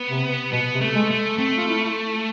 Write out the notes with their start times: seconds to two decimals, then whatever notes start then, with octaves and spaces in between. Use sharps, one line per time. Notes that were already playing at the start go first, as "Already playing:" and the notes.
Already playing: B3
0.10 C3
0.52 B2 B3
0.75 C3
0.81 A3
0.95 G#3
1.11 A3
1.38 A3 C4
1.57 F4
1.68 E4